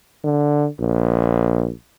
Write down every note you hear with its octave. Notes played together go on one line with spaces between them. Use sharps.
D3
A#1